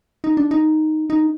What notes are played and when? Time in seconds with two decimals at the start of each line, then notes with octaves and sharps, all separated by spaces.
0.24 D#4
0.37 D4
0.51 D#4
1.10 D#4